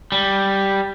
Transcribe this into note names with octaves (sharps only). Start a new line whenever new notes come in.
G3